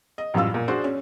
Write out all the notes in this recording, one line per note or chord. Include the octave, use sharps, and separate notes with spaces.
D#5
A1 F#2 G3 F4 E6
A#2
D4 F#4 G#4 C5 D5
C#4